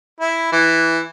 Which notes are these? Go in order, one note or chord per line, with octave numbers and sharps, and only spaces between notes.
E4
E3